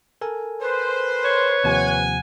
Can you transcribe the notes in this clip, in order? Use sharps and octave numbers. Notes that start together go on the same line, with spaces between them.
A4 A#4 G#5
B4 C5
C#5
D#2 C3 F3 F#5 G#5